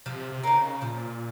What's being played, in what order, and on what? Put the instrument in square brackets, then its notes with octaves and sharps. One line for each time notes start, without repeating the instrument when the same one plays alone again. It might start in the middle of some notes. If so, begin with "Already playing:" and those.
[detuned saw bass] C3 [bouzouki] F3
[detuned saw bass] C3
[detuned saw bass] C#3 [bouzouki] A#3 D#4
[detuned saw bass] A#2 [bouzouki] F3